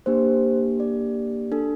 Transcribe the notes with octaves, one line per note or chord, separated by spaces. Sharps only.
A#3 D4 G4 C5
D5
D4 A4